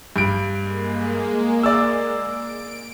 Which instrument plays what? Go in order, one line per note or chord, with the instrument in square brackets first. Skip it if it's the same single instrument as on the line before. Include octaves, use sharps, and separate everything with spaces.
[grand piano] G2 D7
[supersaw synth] G#3 A#3
[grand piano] D5 E6
[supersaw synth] D7